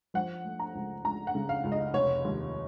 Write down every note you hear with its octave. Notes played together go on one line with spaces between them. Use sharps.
F3 F#5
A3
A#5
C#2
C#2 A#5
F#5
C#3
F5
C#2
D#5
F1 C#5
D#2